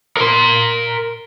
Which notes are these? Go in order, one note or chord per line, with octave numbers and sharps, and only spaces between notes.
A#4 C6